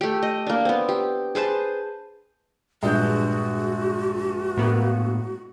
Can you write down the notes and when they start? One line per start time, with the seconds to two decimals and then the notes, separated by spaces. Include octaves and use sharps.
0.01 A3 G4
0.23 D#5
0.47 A#3 D4
0.65 B3 C4
0.89 G4
1.35 G#4 B4 C5 A5
2.83 A#1 G2 G#3 F#4 G6
4.57 A2 A#3 B3